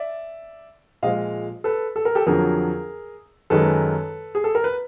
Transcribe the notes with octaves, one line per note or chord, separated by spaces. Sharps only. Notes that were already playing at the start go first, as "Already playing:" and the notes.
Already playing: D5 E5
A#2 F3 G#3 D#5 F5
A4 B4
A4
A#4
G4 A4
F2 D3 F#3 G#4 A#4
F#2 D#3 G#3 A4 B4
G#4
A4
A#4
B4